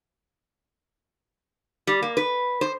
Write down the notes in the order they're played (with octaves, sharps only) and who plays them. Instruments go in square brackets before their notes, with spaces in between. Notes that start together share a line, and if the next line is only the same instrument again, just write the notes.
[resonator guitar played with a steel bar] G3
A#3
B4
C5